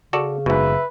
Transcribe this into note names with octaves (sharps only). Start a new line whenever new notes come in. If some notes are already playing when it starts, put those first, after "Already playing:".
C#3 F#4 A4 D5
F#1 G#2 B2 B4 E5